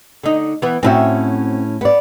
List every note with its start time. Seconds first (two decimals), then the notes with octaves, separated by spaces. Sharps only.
0.23 D3 D#4
0.62 E3 B3
0.83 A2 C4 C#4 D#4 F#4 E5
1.81 B3 D5